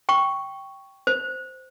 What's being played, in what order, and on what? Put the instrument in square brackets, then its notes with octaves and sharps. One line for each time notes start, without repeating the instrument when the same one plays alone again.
[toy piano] G5 C#6
C5